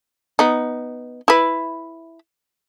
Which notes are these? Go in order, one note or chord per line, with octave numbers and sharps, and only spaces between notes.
B3 D#4
E4 B4